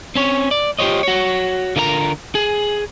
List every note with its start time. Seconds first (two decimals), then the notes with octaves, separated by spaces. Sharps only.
0.15 C4 C#4 C#5
0.51 D5
0.79 F4 G4 G#4 C5 C#5 D#5
1.03 F#4 C#5
1.76 D3 F4 A#4 D5 A#5
2.35 G#4